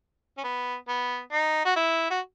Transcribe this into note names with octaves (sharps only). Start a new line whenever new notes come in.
C#4
B3
B3
D#4
F#4
E4
F#4